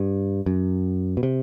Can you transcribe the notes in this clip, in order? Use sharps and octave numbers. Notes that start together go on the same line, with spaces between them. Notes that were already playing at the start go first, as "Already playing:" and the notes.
Already playing: G2
F#2
B2
C3